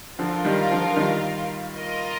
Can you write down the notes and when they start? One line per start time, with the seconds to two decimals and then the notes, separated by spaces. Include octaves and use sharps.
0.19 D3 F3 F4 A#4 F5
0.45 D#3 G3
0.71 D3 F3
0.88 F3
0.97 D#3 G3
1.75 F4 A#4 D#5